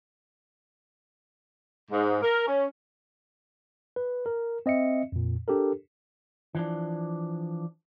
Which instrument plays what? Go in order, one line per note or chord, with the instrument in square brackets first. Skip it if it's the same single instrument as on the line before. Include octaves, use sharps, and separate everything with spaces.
[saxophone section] G#2
A#4
C#4
[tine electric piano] B4
A#4
C4 D#5 E5 C#7
F2 A#2
D4 G4 A4 A#4
[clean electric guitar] E3 F3 D4